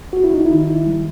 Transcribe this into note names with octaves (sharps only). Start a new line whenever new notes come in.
D#2 F#4
E4
D#4
D#3 E4
G3